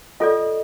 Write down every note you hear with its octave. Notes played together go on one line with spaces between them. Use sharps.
F4 A4 D5 D#5